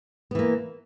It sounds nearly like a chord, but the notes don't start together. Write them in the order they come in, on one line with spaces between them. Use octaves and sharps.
B3 E3 A#3